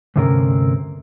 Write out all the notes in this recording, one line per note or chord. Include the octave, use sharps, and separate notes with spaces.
D2 G2 C3 C4 C#4 A#4